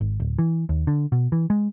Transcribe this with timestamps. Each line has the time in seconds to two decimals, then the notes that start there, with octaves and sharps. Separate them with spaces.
0.01 G#1
0.20 D1
0.39 E3
0.69 D#2
0.87 D3
1.12 B2
1.32 E3
1.50 G#3